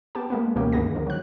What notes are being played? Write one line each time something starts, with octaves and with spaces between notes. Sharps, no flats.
B3 G4 A5
G#3 A#3 B3
C#2 B2 E3 A#3 C#4 G4
D2 G2 D#3 B3 G#4 A#6
D3 D#3 F3
F#3 F#6